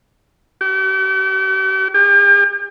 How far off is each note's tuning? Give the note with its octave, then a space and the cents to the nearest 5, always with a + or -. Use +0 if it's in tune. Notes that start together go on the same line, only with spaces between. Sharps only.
G4 -45
G4 +40